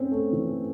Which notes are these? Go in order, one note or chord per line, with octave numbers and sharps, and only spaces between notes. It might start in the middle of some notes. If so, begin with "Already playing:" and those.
Already playing: C4 C#4
A3
E3